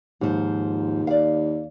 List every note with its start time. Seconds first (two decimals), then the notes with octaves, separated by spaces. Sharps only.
0.21 D#2 G#2 F3
1.07 D5 F5